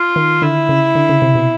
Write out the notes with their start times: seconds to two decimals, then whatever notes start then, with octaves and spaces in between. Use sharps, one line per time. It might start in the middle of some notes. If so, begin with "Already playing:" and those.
Already playing: F4
0.16 D#3
0.42 D3 E4
0.69 C#3
0.95 D3
1.09 C#3
1.22 C3
1.35 B2